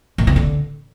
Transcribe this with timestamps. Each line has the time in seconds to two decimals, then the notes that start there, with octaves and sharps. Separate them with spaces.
0.18 A#2
0.27 B2
0.36 D3